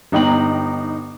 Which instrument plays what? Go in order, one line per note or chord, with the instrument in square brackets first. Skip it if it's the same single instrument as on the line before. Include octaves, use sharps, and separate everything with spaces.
[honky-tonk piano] G1 D#4 G5 A#5 F#7